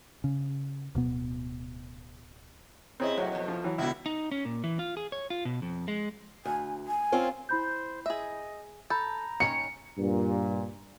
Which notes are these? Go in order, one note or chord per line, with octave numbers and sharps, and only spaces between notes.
C#3
D1 B2 B3
C3 C4 C#4 E4 G#4 D#5
A2 C3 F#3 F#4
F2 B2
F3
E3 F#3
C#2 B2 D3 E4
D#4
C#4
A#2
E3
F4
G#4
C#5
F4
B2
F2
G#3
D2 G#5
G#5
C4 C#4 F4
E4 C5 B5 G6
G#4 D#5 E5
A4 A#5 B5 G6 A6
D#3 C#4 C#5 C#7
G2 A#2